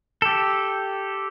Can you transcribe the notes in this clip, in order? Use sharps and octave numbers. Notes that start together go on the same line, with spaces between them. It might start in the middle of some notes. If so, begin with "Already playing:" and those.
G4 A4